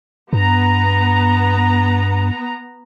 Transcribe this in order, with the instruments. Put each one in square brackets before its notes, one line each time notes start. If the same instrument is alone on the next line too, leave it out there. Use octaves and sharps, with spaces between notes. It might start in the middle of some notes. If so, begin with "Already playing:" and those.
[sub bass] G2 [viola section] B3 A#5